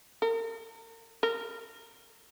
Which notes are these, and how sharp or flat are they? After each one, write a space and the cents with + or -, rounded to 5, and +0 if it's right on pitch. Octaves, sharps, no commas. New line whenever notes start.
A#4 -40
A#4 -15